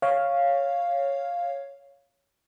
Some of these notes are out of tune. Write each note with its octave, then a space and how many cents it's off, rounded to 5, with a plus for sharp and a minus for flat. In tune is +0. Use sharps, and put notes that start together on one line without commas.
C#5 +0 F5 +0